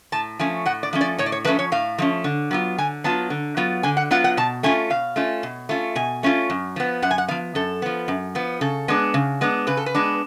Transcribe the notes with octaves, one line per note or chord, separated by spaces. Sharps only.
A2 A5
F3 A3 C#4 G#5
A2 F#5
D5
F3 A3 C#4
D5
A2 C#5
D5
C#5
F3 A3 C#4 B4
C#5
A2 F5
F3 A3 C#4
D3
F#3 B3 F4
D3 G#5
F#3 B3 F4 A5
D3
F#3 B3 F4
D3 G#5
F#5
F#3 B3 F4 F#5
F#5
B2 A5
A3 C#4 F4 G#5
B2 F5
A3 C#4 F4
B2
A3 C#4 F4
B2 G#5
A3 C#4 F4
F#2
F3 B3
F#2 F#5
G#5
F#5
F3 B3 F5
F#2 A4
F3 B3
F#2
F3 B3
C#3 A4
G#3 B3 D4
C#3
G#3 B3 D4
C#3 B4
A4
B4
G#3 B3 D4